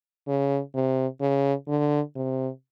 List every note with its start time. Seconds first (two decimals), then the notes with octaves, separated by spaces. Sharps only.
0.28 C#3
0.74 C3
1.21 C#3
1.68 D3
2.16 C3